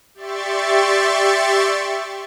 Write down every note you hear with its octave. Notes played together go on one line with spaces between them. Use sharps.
G4 D5 E5 C6 C#6 A6